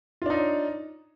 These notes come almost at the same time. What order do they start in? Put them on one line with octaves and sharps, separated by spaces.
F4 D4 D#4 C#5